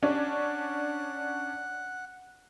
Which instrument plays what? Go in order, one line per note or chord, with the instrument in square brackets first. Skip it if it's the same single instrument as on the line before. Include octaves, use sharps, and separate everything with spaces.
[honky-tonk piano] C#4 D4 [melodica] F#5